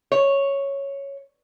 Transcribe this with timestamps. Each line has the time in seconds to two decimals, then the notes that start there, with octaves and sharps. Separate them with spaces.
0.12 C#5